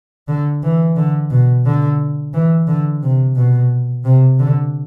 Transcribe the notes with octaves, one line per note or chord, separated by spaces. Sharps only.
D3
E3
D3
B2
D3
E3
D3
C3
B2
C3
D3